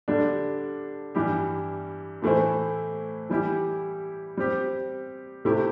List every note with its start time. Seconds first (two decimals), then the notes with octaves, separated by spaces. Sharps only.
0.08 D3 G3 D4
1.15 G2 E3 G3 E4 G4
2.22 A2 E3 A3 E4 C5
3.30 E3 G3 E4 G4
4.37 G3 C4 G4
5.45 C3 A3 E4 G4